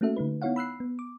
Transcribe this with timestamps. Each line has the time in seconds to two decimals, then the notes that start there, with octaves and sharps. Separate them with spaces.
0.01 A3 A#3 C#4 F#4 A4 E5
0.17 D3 A3 D#4 B4
0.42 B3 D#4 E4 C#5 F5 F#5
0.56 B5 E6 F#6 C7
0.80 B3
0.99 D6